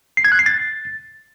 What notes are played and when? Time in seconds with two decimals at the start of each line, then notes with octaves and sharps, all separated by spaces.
0.17 C7
0.25 G#6
0.32 F#6
0.39 C7
0.46 A6